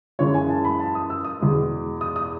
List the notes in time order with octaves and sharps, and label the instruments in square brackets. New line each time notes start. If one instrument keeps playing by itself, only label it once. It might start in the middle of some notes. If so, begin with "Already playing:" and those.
[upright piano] F#2 E3 G#3 C#5
G#5
A5
B5
A5
D#6
E6
D#6
E2 B2 G#3
D#6
D#6